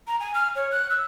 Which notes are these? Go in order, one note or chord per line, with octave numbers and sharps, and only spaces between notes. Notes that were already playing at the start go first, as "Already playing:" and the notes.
A#5
G#5
F6
C#5
F#6
E6